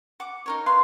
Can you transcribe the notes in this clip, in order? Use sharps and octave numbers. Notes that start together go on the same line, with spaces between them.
F#5 D6
D#4 A#4 C#5
B4 F5 C6